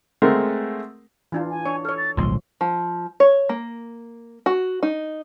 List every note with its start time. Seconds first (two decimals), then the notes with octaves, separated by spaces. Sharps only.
0.22 G#3 A3 C4 A#4 F#5
1.32 E3 D4 F4
1.50 G#5
1.65 D4 C#5
1.85 A4 C#5 F6
1.97 A6
2.17 D1 B1 F3 G#3 C6
2.61 F3
3.20 C#5
3.49 A#3
4.46 F#4
4.83 D#4